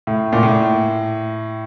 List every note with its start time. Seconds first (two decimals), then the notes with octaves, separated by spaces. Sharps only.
0.07 A2
0.33 A#2
0.43 A2